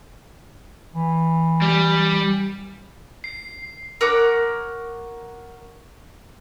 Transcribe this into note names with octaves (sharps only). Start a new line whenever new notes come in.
E3
G3
C7
A#4 C#5 F#5 D6